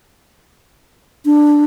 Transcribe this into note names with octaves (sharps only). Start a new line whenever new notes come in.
D4